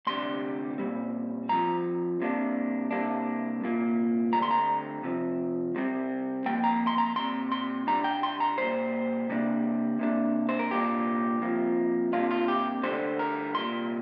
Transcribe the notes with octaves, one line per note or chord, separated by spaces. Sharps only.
D2 C3 G3 D4 C6
A#2 G3 C4
F2 F3 C4 A#5
C2 C3 A#3 D4
C2 C3 A#3 D4
C2 A#2 A#3
D2 D3 G3 C4 A#5
C6
A#5
C3 F3 C4
C2 C3 G3 C4
F2 F3 A#3 G5
A#5
C6
A#5
A#2 G3 C4 C6
C6
C3 G3 D4 A#5
G5
C6
A#5
A#2 G3 A#3 C5
C3 G3 A#3 D4
C3 A#3 D4
C5
A#4
C2 A#2 A#3 D4 G4
C2 C3 F3 A#3
C2 C3 A#3 D4 F4
F4
G4
D2 D3 G3 C5
A#4
C2 A#2 G3 A#3 C6